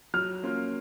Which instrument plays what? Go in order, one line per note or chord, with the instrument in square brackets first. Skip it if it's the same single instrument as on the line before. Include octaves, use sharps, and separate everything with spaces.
[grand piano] F#3 [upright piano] F6
[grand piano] A#3 C#4 F4